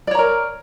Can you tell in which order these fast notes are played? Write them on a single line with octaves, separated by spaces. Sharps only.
D5 C#5 A#5 A#4